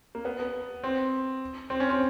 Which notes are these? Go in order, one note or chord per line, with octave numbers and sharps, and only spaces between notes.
A#3
B3
B3
C4
C4
C#4
C4